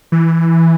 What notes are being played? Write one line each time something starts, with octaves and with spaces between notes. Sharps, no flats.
E3